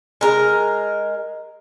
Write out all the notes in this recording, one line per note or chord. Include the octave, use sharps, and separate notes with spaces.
G#3 A#4